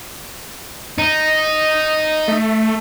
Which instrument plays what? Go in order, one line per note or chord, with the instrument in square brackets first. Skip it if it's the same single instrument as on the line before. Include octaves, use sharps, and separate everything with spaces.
[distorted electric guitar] D#4
[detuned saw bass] A3